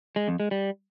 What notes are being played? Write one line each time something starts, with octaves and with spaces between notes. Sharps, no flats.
G#3
F2
G#3
G3